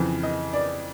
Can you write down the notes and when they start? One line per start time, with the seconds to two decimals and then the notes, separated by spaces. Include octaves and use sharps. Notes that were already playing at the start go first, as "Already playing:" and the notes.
Already playing: F2 C#3 E3
0.23 D#5
0.53 D5